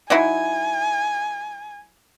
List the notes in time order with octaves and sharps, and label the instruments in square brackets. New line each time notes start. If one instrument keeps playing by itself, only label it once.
[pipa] F#3 D#4 E4 [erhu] G#5